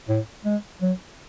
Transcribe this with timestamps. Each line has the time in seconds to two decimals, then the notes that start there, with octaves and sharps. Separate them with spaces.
0.09 A2
0.45 G#3
0.82 F#3